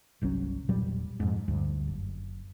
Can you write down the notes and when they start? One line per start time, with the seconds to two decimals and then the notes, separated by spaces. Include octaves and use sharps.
0.22 G1 C2 F#3 C#4
0.69 E1 A#2 F#3 G3
1.20 F2 G#2
1.48 D2 G2
1.87 F#1